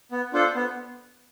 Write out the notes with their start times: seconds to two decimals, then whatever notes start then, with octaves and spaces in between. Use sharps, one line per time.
0.12 B3
0.33 D4 F4 A4 C5
0.55 B3